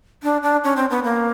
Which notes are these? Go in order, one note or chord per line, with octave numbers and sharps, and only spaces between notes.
D4
D4
C#4
C4
B3
A#3